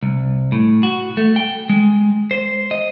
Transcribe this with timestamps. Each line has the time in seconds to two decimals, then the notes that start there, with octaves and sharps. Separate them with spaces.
0.03 C2
0.52 A2
0.83 F#4
1.17 A3
1.36 G5
1.69 G#3
2.31 C5
2.71 D#5